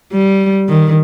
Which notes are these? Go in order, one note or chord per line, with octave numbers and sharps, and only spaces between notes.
G3
D#3